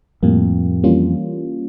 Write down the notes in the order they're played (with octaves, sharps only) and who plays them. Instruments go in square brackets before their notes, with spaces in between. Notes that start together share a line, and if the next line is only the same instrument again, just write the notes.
[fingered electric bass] F2 [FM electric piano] A2 G3 A#3
[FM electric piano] E3 G3 A#3 C#4 F4